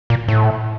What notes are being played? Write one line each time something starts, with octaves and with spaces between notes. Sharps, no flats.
A#2
A2